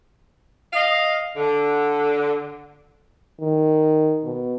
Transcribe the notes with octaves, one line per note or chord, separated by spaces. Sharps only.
D#5 F5
D3
D#3
B2